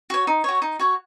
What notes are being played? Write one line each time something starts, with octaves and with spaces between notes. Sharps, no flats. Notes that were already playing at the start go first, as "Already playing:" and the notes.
F#4 C#5
D#4
F#4 C#5
D#4
F#4 C#5